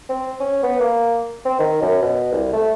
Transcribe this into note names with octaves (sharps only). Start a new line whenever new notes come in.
C4
C#4
B3
A#3
C4
D#3
F#2
B2
C2
A3